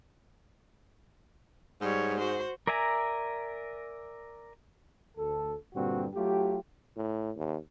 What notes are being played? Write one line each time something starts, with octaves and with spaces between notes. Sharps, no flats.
G#2 G3 C#5
F#4 C5
A#4 D5 E5 G#5 A#5
D2 A4
G2 A#2 D3 G3 C4 F#4
F#3 A3 F4 G4
A2
D#2